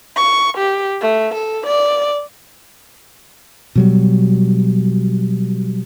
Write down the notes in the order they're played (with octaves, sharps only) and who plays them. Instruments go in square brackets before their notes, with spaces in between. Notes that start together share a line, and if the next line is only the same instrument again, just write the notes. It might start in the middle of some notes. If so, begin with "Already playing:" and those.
[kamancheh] C#6
G4
A3
A4
D5
[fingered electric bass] B2 F#3 G3